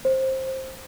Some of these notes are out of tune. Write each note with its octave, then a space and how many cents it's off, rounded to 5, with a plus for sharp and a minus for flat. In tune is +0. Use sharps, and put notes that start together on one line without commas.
C5 +15